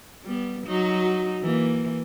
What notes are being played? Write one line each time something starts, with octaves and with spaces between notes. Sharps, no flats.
G3 B3
F#3 D#4 F#4
E3 A#3